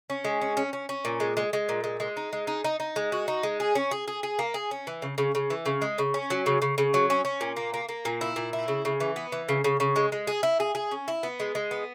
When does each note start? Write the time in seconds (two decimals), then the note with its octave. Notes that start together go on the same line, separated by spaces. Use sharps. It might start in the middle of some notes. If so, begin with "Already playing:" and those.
0.10 C#4
0.25 G#3
0.41 C#4
0.57 C#4
0.73 C#4
0.89 C#4
1.05 A#2
1.20 G#3
1.37 G#3
1.53 G#3
1.69 A#2
1.84 G#3
2.00 G#3
2.17 D#4
2.33 G#3
2.47 D#4
2.64 D#4
2.80 D#4
2.96 G#3
3.12 F#4
3.28 D#4
3.43 G#3
3.60 G#4
3.75 C#4
3.91 G#4
4.08 G#4
4.23 G#4
4.39 A#3
4.54 G#4
4.71 C#4
4.87 E3
5.02 C#3
5.18 C#3
5.35 C#3
5.50 E3
5.66 C#3
5.82 G#3
5.98 C#3
6.14 C#4
6.30 F#3
6.46 C#3
6.62 C#3
6.78 C#3
6.94 F#3
7.10 C#4
7.25 C#4
7.41 A#2
7.57 A#3
7.74 A#3
7.89 A#3
8.05 A#2
8.21 E4
8.36 A#2
8.53 E4
8.68 C#3
8.85 C#3
9.00 E3
9.16 B3
9.32 E3
9.49 C#3
9.64 C#3
9.80 C#3
9.96 G#3
10.12 G#3
10.27 G#4
10.43 E4
10.60 G#4
10.75 G#4
10.91 C#4
11.08 E4
11.23 B3
11.40 G#3
11.55 G#3
11.71 B3